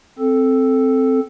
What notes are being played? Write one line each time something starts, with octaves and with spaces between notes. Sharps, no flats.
C4 A4